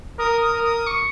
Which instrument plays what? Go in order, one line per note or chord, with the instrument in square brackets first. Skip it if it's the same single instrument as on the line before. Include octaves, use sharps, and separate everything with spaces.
[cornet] A#4 [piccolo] D#6
[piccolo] D#6
[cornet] A#4
[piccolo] D#6
C#6